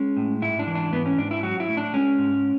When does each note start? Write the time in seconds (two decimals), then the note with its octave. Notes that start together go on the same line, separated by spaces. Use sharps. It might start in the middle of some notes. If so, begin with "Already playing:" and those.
Already playing: G#3 C#4
0.17 A2
0.42 G#2 E4
0.59 D4
0.67 E3
0.75 D4
0.93 G#2 B3
1.06 C#4
1.18 G#2 D4
1.31 E4
1.43 F#3 F#4
1.60 E4
1.68 A2
1.77 D4
1.94 G#3 C#4
2.19 G#2